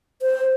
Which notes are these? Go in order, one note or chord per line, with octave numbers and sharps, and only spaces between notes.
C5